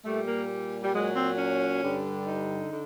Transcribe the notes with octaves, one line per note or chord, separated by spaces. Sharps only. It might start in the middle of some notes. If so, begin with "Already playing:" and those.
A#2 G3 A3
A#3
G3
A#2 F#3 G#3
C4
C#4
G2 D3 G3
D#4
D3